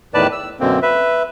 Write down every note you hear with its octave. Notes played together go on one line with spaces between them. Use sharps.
E2 A2 D#3 B4 D5 A5
E6
F#2 B2 D3 A#3 C4
B4 E5